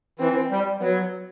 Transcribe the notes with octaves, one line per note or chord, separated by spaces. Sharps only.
E3 C4
G3
F#3 B3